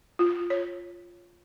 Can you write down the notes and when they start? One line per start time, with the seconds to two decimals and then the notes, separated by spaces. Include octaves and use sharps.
0.19 F4
0.50 C#5